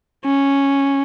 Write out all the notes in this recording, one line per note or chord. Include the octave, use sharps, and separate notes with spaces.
C#4